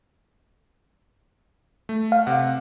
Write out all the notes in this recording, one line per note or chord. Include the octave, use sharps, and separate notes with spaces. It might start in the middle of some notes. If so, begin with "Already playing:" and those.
A3
F5
C3 F#5